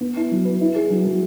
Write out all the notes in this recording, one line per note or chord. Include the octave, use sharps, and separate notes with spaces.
B3
E4
F#3
B4
E4
G#4
F#3
F#3